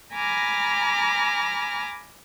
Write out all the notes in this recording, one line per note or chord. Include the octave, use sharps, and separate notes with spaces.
G#5 A#5 B5 D6 F6 A#6